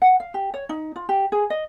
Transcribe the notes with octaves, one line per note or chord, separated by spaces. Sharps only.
F#5
F5
G4
C#5
D#4
F4
G4
G#4
D#5